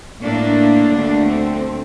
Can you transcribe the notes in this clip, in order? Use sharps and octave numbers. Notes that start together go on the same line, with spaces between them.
A2 A3 A#3 D4
D2 D3 A3
C4